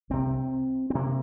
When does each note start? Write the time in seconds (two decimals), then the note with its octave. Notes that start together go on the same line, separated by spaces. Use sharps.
0.10 C2 C3 C4
0.90 C4
0.95 C3 A#3